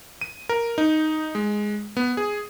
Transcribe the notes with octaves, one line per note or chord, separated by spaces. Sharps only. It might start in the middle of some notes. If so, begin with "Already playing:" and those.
D#7
A#4
D#4
G#3
B3
G#4